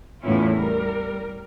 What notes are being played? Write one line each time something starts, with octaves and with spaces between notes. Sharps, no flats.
E2 A2 C#4 E4 F4
G3 A#4